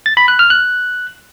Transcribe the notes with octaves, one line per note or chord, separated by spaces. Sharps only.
A6
B5
F#6
F6
F#6